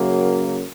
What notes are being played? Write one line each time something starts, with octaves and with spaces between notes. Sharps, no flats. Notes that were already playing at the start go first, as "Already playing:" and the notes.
Already playing: F#2 C#3 F#3 A#3